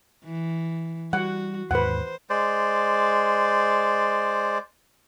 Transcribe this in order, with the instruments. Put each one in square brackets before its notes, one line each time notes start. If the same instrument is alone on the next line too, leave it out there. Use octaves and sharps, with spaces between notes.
[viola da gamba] E3
[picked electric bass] G3 [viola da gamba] F#4 [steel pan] F#5
[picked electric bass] D#2 G#2 [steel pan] B4 F#5 [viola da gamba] C5
[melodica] G#3 C5 D5